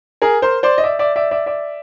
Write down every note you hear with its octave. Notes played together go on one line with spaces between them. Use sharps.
G#4 A#4
A#4 C5
C5 D5
D#5
D5 E5
D5 E5
D5 E5
D5 E5
D5 E5